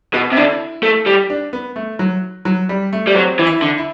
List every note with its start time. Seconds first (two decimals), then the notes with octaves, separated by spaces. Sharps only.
0.14 B2 F#4
0.32 C3
0.36 D3 E4
0.83 A3
1.06 G3
1.30 D4
1.53 B3
1.76 A3
1.99 F#3
2.45 F#3
2.69 G3
2.93 A3
3.07 G3
3.15 F#3 C4
3.39 E3
3.46 E4
3.62 D3
3.78 E4